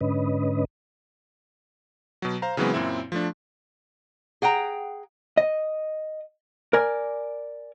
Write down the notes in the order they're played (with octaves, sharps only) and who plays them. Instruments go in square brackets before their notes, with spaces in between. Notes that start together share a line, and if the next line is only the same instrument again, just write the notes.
[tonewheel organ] G#2 D3 C#4 B4 D#5
[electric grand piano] B2 F#3
C5 F5 A#5
C#3 E3 F#3 G#3 B3 C4
F#2 A#2 C4 E4
F3 A3 D4
[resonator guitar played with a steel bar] G#4 F#5 G5 A#5
[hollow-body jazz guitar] D#5
A#4 D5 G#5